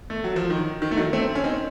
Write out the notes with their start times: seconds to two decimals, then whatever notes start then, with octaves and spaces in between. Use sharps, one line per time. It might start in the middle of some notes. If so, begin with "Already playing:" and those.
0.10 A3
0.24 F#3
0.36 F3
0.50 D#3
0.82 D#3
0.91 A3
0.97 D#3 F#3
1.13 A3 C4
1.35 C#4
1.44 C4 D#4